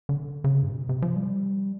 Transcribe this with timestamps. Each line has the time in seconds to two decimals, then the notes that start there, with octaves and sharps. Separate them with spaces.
0.09 D3
0.44 C#3
0.63 G2
0.72 C3
0.76 B2
0.89 C3
1.02 F3
1.16 G3